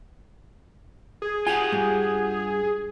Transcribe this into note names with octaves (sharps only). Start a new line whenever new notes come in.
G#4
F4 G4 F#5 G#5
G2